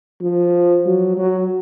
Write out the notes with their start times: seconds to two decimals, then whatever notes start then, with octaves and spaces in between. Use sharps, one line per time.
0.22 F3
0.86 F#3
1.18 F#3